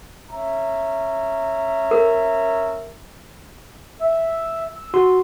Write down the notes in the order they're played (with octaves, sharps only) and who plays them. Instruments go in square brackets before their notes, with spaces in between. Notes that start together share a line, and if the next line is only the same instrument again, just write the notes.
[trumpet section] C#4 E5 A#5
[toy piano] A#4
[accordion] E5
E6
[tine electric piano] F#4 C6